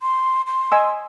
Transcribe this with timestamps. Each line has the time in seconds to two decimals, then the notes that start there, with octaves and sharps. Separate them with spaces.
0.02 C6
0.46 C6
0.72 D#5 G#5 E6